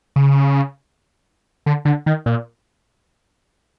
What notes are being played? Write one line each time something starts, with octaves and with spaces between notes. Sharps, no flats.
C#3
D3
D3
D#3
A#2